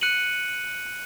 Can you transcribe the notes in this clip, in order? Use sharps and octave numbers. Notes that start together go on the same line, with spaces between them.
F#6 C#7 D#7 F#7